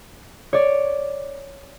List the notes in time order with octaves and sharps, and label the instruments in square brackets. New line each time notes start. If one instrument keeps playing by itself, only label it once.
[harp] C#5 D5